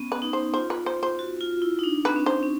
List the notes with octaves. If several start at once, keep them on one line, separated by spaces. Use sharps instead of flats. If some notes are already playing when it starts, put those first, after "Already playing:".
Already playing: B3 C#4
B4
D#4
C5
F4 C5
B4
C5
C5
F#4
F4
E4
D#4
D4
C4 B4
C#4
C5
C#4